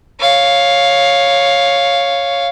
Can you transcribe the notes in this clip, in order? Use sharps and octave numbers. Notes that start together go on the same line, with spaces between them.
C#5 F5